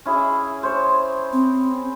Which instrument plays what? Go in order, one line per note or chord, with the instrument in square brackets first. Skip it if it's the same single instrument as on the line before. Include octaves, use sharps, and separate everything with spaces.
[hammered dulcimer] C#4 E4 G#4
C5 C#5
[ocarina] C4